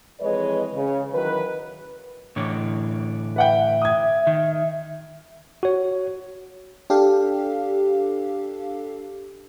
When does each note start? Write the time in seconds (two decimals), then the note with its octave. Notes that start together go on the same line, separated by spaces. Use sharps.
0.21 F2 E3 G#3 B4 C#5 D#5
0.73 C#3
1.14 D#3 E3 F#3 B4
2.36 A2 D3 E3
3.36 B4 E5 F#5 G5
3.82 D#6 G#6
4.27 D#3
5.63 F#4 C#5
6.90 D4 G4 A4 F5